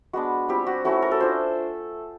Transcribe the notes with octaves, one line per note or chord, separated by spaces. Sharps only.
G#3 B3 D4 F#4
G3 C4 F4 G4
F#4
A3 C#4 E4 F#4
A#4
A4
A3 D4 F4 C5